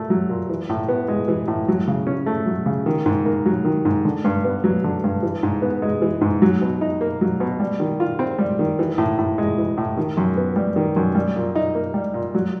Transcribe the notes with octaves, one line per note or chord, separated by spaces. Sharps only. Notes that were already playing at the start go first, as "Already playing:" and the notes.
Already playing: A#2 A3
F#3
A#2
E3
A2
B3
G#3
E3
A2
F#3
C#3
C#4
A3
F#3
C#3
D#3
G#2
A#3
F#3
D#3
G#2
D3
G2
B3
F#3
D3
G2
E3
G#2
B3
G#3
E3
G#2
F#3
B2
D#4
A#3
F#3
B2
G3
D#3
F4
C4
G3
D#3
E3
A2
A2
G#3
E3
A2
D#3
F#2
B3
G3
D#3
F#2
G3
A#2
D#4
A#3
G3
A#2
F#3